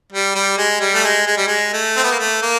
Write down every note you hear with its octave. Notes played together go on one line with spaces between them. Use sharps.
G3
G3
G#3
G3
A3
G#3
G#3
G3
G#3
A3
C4
B3
A#3
A3
A#3